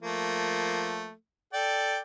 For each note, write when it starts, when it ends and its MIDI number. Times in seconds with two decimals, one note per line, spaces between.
0.02 1.12 53
0.02 1.12 57
0.02 1.12 58
1.53 1.99 69
1.53 1.99 74
1.53 1.99 79